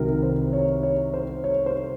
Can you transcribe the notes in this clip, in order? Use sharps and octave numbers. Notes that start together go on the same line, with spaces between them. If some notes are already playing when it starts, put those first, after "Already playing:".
Already playing: C2 C3 D#3 F#3 A#4
C5
C#5
C#5
C5
C#5
C5